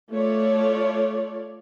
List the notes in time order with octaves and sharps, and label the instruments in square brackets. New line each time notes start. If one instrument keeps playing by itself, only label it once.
[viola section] A3 F4 C#5 D5